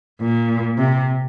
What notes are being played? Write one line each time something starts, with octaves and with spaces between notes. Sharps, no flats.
A#2
C3